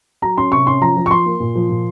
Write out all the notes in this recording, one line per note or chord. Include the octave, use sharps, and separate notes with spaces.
F#3 A#5
C#4 C6
C3 C#6
C#4 C6
F3 A#5
F3
C#6
F3 C6
A#3
A#2
F3
A#2